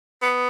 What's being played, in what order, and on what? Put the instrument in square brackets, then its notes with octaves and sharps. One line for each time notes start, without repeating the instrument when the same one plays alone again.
[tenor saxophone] B3